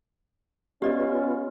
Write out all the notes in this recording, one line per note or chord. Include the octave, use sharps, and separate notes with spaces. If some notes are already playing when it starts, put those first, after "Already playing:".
B3 C#4 F4 G4 D5 D#5